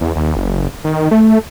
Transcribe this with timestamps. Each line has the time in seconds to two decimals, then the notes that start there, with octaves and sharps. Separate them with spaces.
0.01 E2
0.16 D#2
0.36 F#1
0.84 D#3
1.11 A3